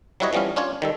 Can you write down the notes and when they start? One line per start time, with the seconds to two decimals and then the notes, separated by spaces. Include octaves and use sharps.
0.20 F#3 G3 E4 B4 C#5 D#5
0.33 E3 F3 G3 B3 C#4 F5
0.56 C#4 D4 F4 C#5
0.82 D#3 G3 A4